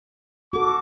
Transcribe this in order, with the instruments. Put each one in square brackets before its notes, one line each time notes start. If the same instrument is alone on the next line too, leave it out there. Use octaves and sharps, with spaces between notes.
[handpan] F#4 A4 [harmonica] D6